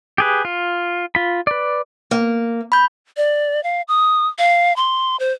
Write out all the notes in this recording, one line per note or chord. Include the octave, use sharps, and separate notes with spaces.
G4 G#4 B4
F4
F4 B5
B4 D5
A#3
B5 G6
D5
F5
D#6
F5
C6
C5